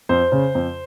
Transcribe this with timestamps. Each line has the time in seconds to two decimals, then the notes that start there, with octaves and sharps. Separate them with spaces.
0.09 F2 C5
0.32 C#3
0.55 F2